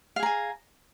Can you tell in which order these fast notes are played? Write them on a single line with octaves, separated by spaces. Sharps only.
F5 G#4 A#5 G#5